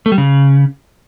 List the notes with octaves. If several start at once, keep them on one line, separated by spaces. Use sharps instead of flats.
A3
G3
C#3